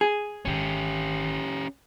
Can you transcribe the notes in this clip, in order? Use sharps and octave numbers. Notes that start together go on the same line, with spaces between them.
G#4
G#1 D#3 C#4 G4